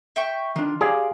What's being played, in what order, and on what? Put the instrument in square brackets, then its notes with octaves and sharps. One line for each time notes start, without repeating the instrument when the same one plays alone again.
[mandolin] E5 G5 C#6
[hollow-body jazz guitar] D#3 D4 [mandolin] F4
[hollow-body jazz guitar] G4 D5 F5 [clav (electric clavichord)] G#4